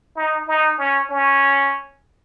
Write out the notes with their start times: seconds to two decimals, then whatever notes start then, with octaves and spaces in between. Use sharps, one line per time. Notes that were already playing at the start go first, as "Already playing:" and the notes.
0.16 D#4
0.48 D#4
0.78 C#4
1.10 C#4